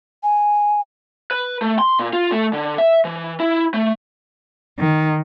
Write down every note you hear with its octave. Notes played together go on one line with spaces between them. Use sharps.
G#5
B4
A3
C6
A#2
F4
A3
D3
E5
E3
E4
A3
D#3